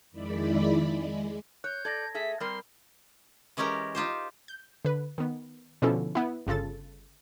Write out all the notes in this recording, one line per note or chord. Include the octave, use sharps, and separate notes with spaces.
F2 D#3 G#3 E4 D5 B5
G#3
C#5 F#6 G6
A4 D5 G#6 A#6
A3 G#4 E5 B6
G3 C4 A#4 C6
E3 G#3 C#4 G4 A#4 A#5
D#4 F4 G4 C5
G6
D3 B4
D#3 B3
B2 D3 F3 C#4 E4 A4
B3 E4
G1 C#3 F4 A4 A6